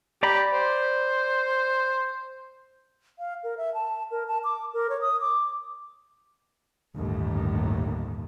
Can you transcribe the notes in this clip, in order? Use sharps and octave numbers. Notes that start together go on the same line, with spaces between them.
G4 D5 A#5 B5
C5
F5
A#4
E5
A5
A#4
A5
D6
A#4
C#5
D#6
D6
G1 D#2 A2